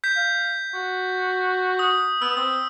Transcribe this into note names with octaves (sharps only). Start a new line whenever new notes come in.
G6 B6
F5
F#4
D#6
B3 E6
C4 D#6